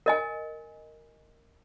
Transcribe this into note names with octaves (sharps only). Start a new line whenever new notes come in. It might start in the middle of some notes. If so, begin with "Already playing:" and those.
A#4 D#5 G#5